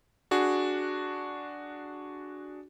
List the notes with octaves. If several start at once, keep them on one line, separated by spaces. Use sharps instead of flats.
D4 F#4 G#4